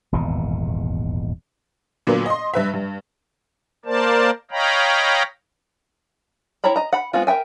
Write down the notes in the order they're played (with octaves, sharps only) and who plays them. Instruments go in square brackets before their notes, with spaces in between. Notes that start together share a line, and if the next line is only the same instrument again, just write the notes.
[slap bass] D#1 G#1 E2 B2
[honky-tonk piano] A#2 D3 F#3 A#3 B3
D#5 C6
G2 B4 E5
G2
[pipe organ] A#3 A#4 C5 D5 A5
C#5 D#5 F5 G5 A#5 B5
[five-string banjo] E4 C#5 G5 A#5 B5
D#5 A#5
F#5 B5
G#3 B3 C4 F4
A#4 E5 G5 G#5